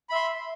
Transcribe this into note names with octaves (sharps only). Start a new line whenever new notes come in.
E5 B5 C6